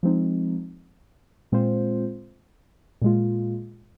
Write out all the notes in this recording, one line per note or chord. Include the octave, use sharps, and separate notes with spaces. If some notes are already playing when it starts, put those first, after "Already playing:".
F3 G#3 C4 D#4
A#2 G#3 C4 F4 C5
A#2 G#3 F4